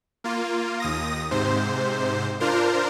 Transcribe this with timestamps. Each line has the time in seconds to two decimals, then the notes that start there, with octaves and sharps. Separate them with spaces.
0.24 A#3 F4
0.80 D#2 D#6 A#6
1.31 G#2 C3 C5
2.40 D4 F4 A#4 C5